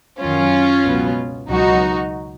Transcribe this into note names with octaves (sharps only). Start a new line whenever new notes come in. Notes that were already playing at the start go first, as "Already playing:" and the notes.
F#2 D#3 F#3 C#4 F4
C#2 B2 F#3 B3
C#2 B2 F#3 D#4 F#4